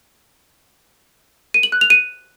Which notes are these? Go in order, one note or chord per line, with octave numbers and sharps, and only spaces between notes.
D#7
F#7
F#6
F7
D#7